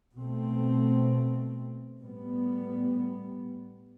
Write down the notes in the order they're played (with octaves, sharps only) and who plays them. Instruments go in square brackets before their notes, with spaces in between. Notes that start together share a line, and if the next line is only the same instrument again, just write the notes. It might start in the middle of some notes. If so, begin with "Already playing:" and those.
[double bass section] B2 A3 C4
A2 G3 B3